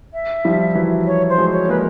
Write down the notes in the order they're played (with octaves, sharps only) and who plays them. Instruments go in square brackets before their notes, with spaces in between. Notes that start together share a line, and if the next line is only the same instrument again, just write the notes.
[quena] E5
[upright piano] F3 G3
E3 F#3
[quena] C#5
C5
[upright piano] F#3 G#3
[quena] C#5
[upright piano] G#3 A#3 [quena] B4